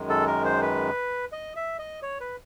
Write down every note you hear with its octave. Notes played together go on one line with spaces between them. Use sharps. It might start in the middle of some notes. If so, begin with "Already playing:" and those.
Already playing: F#2 D#3 G#3
A4
A#4
C5
B4
D#5
E5
D#5
C#5
B4